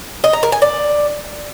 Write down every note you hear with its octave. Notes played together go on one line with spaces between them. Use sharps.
D#5
A#5
A#4
G#5
D5